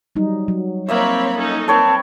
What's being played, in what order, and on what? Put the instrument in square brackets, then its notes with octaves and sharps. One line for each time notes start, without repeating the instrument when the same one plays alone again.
[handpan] F#3 G3 D#4
F#3
[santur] A#3 D#5 E5 [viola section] C4 C#5 B5
[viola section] C#4 D#4 A4
[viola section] C4 A#4 [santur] B4 C#5 G5 [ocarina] A5